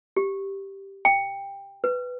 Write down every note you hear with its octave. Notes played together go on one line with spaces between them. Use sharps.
G4
G5
B4